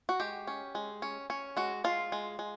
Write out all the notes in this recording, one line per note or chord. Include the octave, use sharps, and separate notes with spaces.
F#4
G#3 G4
C#4
G#3
C#4
C#4
G#3 F#4
G#3 F4
G#3
G#3